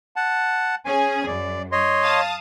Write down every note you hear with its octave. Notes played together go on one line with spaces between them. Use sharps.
F#5 A5
C#4 G#4 G#5
F#2 D5
C#5 D#5 C6
F5 A5 D#6